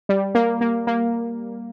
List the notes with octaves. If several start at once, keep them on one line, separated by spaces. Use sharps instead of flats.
G3
A#3
A#3
A#3